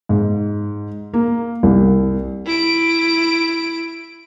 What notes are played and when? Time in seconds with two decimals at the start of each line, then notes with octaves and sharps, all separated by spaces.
0.09 G#2
1.14 A#3
1.63 C2
2.46 E4 D7